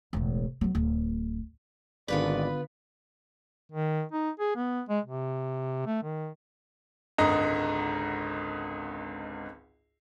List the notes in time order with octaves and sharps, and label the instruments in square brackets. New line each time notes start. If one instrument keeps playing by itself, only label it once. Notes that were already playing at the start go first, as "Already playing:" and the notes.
[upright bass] E1 A1
F#3 B3
D1
[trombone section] G#1 [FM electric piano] D3 B5 [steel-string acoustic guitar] B3 F4 B4 [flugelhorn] D5
[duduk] D#3
D#4
G#4
B3
G#3
C3
A3
D#3
[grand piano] G#1 C#2 D3 D#5 A#5